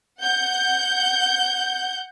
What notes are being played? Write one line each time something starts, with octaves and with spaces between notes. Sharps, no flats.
F#5 G6